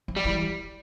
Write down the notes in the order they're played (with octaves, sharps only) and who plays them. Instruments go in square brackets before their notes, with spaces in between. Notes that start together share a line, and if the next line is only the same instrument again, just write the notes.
[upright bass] F3
[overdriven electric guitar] G3
[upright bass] E3